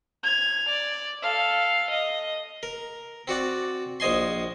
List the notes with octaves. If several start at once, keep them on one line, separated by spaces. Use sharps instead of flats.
G#6 F7
D5
A4 F5
D#5
A#4
C4 F#4 D5 F#5
A#1 C5 D#5 G#5 C6